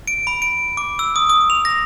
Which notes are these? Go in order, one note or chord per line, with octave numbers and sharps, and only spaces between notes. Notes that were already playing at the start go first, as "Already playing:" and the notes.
D7
B5
D7
D6
E6
D#6
D#6
F7
A#6